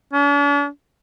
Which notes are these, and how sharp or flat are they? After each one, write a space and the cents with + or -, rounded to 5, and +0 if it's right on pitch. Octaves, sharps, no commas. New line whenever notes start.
D4 -45